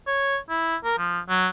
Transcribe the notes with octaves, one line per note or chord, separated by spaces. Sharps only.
C#5
E4
A#4
F3
F#3